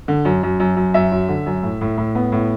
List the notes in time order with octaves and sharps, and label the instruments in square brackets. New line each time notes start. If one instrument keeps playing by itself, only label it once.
[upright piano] D3
F#2
F#2
F#2
F#2
F#2 E5
F#2
D3
F#2
A2
A2
A2
B3
A2